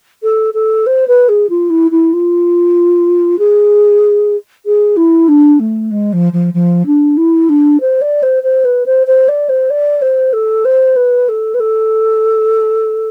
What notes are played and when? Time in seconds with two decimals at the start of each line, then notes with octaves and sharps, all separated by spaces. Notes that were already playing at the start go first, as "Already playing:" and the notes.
0.23 A4
0.54 A4
0.87 C5
1.08 B4
1.29 G#4
1.50 F4
1.70 E4
1.91 E4
2.13 F4
3.39 G#4
4.66 G#4
4.97 E4
5.28 D4
5.60 A3
5.91 G#3
6.13 F3
6.33 F3
6.54 F3
6.86 D4
7.17 E4
7.49 D4
7.81 C5
8.01 D5
8.23 C5
8.43 C5
8.65 B4
8.86 C5
9.07 C5
9.29 D5
9.49 C5
9.70 D5
10.02 C5
10.33 A4
10.65 C5
10.96 B4
11.29 A4
11.54 B4
11.60 A4